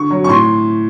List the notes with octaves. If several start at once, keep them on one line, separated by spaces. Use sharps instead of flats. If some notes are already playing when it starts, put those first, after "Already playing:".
Already playing: D3 C#6
F#3
C#6
A2 C6